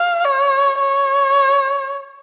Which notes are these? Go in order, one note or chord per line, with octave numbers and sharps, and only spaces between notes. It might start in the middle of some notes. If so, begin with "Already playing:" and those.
Already playing: F5
C#5
C#5